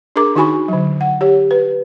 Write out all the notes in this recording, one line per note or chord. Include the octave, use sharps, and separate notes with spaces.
D4 G#4 A#4 A#5 D6
D#3 D#4 F#4 G#5 B5 C#6
D3 F#3
F#5
G4 C#5
B4